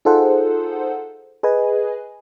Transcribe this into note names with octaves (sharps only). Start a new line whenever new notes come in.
D#4 F4 G#4 A4 C5 F#5
G#4 B4 D#5 G#5